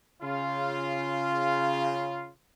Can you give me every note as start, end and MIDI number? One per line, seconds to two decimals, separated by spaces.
0.23 2.30 49
0.23 2.30 65